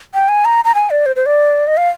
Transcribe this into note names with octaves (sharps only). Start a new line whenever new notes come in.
G5
G#5
A#5
A#5
G#5
D5
C5
C5
D5
D#5
F5